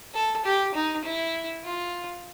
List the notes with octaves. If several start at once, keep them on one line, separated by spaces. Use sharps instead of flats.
A4
G4
D#4
E4
F4